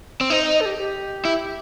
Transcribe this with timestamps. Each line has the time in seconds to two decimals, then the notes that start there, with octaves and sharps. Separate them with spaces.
0.21 C4
0.30 D#4 C5
0.42 D#5
0.54 D#5
0.61 A4
0.65 G4
0.78 G4
1.25 E4